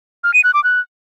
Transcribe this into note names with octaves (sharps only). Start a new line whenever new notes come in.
F6
D#7
F#6
D6
F#6